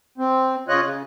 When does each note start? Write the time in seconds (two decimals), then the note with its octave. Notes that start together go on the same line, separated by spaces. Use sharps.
0.18 C4
0.68 C#3 F4 C#5 D#5 F#6
0.82 C#3